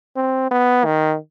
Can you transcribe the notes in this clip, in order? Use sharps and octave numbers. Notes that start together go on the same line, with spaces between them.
C4
B3
D#3